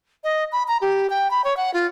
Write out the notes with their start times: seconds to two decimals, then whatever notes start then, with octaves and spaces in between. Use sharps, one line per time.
0.24 D#5
0.52 B5
0.68 A#5
0.81 G4
1.10 G5
1.31 B5
1.44 C#5
1.57 F#5
1.74 F4